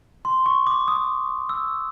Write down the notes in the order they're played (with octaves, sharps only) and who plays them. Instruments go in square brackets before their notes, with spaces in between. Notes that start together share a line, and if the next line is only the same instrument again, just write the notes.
[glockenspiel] C6
C#6
D6
D#6
E6